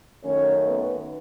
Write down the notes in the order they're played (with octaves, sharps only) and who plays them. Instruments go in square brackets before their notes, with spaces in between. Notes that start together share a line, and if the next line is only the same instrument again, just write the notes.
[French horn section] F#2 D#3 A3 C#4 C#5
B3 B4